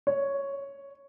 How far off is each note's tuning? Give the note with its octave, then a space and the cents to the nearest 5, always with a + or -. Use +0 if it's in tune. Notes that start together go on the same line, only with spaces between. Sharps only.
C#5 +0